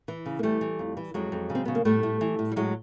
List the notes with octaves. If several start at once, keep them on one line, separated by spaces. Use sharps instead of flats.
E3
C#3
A#3
E3 G3 A3
E3
F2
E3
F2 F#3 G#3
F2
C#3
C4
C#3 B3
A#3
A2 G3 A3
A2
E3
A2
G3
A2 F#3 G#3